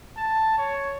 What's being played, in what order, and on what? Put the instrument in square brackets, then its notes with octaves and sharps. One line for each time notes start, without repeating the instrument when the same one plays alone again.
[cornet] A5
C#5